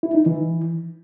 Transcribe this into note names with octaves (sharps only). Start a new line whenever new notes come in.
E4
D#4
E3